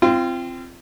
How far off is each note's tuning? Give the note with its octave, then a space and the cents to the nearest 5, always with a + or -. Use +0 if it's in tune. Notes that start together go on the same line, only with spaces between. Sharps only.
C4 +0 F4 -30